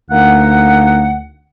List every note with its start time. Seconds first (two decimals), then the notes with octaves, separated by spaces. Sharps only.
0.10 D2 A#3 D#4 F#5